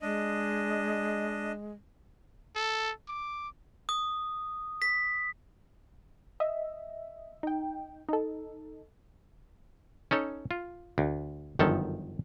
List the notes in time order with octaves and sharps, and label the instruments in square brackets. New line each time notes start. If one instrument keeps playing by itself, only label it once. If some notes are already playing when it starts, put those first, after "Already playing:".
[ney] G#3 [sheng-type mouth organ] D4 D#5
[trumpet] A4
D6
[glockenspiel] D#6
B6
[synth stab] D#5 E5
D#4 G5
D#4 A4
[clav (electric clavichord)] C#4 D#4 A4 C#5
F4
D2
G1 F#2 D#3 F3 A4